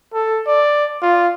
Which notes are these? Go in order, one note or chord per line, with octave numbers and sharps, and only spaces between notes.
A4
D5
F4